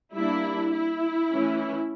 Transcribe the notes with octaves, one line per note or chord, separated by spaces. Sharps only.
G3 A#3 D4 E4
E4
E3 A3 C#4